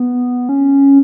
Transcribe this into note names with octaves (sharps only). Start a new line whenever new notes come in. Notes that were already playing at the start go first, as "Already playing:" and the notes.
Already playing: B3
C#4